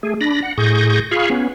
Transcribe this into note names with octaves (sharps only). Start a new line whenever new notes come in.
A3 G#4
D4 B5 A#6
F#5
A2 G#4 C#6 G6 A#6
F4 G#4 F5 B5 C#6
B3 C#4